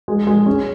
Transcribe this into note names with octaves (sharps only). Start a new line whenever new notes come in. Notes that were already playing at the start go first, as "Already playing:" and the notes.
G#3
G#3
C#4